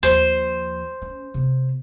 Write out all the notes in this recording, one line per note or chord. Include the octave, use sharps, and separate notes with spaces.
D#2 F3 C5
C#4
C3 B3